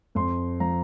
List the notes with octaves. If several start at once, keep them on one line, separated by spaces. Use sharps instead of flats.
F2 C6
F3 A#5